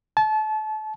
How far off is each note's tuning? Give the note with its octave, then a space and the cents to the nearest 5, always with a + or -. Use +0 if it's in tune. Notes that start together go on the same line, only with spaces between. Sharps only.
A5 -30